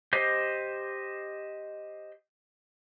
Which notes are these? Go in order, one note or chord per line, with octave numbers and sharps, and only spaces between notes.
G4 C5 D#5